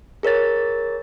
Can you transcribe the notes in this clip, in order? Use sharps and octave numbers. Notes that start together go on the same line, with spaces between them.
G#4 A#4 C#5 A6